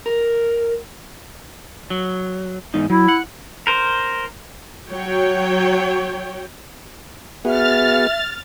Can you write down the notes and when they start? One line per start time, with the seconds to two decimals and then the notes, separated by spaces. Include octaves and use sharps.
0.06 A#4
1.90 F#3
2.74 E2 G#2 D#4
2.90 F#3 E4
3.08 F#5
3.67 A#4 C5
4.91 F#3 C#5 G5
7.45 B3 F#4 G#4 E5 F6 A6